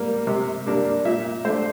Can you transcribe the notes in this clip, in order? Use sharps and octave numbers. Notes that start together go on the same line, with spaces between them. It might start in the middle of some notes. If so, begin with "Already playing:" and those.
Already playing: G3 A#3
C3
G3 A#3 D4
A#2 E5
A3 D4 C5